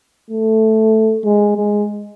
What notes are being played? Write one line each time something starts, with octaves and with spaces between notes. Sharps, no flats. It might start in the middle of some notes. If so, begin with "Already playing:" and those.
A3
G#3
G#3